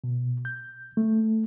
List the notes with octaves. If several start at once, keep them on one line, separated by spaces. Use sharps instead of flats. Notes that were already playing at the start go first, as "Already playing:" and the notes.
B2
G6
A3